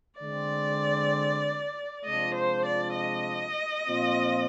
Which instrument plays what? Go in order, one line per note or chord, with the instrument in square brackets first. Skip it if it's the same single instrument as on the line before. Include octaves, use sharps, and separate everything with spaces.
[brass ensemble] D3 G#3 C4 [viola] D5
[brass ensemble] C3 F3 G#3 D4 F4 [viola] D#5
[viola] C5
D5
D#5
[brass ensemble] A#2 F3 C4 F4